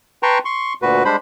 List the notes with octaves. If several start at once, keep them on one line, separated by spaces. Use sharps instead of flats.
B4 G5 A5 A#5 C6 C#6
C6 C#6
D2 A#2 F#4 B4
G3 G#3 D4 C5 B5